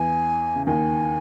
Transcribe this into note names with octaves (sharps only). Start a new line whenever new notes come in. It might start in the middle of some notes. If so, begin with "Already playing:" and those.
Already playing: E2 E3 G#5
C#3
D#2 D#3 G#5